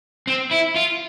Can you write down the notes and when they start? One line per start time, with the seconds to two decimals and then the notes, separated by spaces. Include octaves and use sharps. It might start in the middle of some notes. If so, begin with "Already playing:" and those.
0.27 C4
0.51 E4
0.76 F4